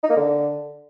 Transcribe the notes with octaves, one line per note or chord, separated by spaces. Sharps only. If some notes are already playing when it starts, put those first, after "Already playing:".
D#4
A#3
D3